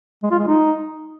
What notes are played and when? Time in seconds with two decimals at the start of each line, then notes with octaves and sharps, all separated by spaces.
0.23 G#3
0.31 F4
0.39 G#3
0.47 D#4